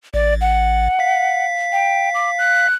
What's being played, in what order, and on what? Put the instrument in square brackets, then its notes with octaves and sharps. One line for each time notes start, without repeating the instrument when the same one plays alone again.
[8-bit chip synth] A1 [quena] D5
[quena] F#5
[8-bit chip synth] F5 B6
[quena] G5
D6
F#6